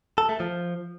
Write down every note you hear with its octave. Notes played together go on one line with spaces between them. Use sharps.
A4
A3
F3